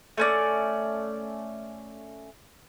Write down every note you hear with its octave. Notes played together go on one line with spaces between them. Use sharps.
A3 C#4 D5